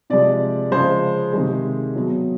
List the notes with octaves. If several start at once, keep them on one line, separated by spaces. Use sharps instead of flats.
C3 F3 G#3 D5
C#3 F3 G#3 C5
C3 D#3 G#3
B2 F#3